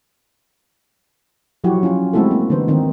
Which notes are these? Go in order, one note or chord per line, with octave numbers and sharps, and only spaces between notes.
F3 F#3 E4 F#4 G4
C#4 F4
G#3 A3 C4 E4 F#4 A4
A#3
D3 E3 B3 D#4 B4 C5
D#3 C4 D#4